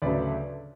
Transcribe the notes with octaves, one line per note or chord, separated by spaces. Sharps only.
D2 C#3 F#3 A3 B4 D5